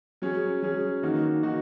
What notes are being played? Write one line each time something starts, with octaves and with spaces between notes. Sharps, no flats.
F#3 C#4 G#4
F#3 C#4 G#4
D#3 A#3 D#4 F#4
D#3 A#3 D#4 F#4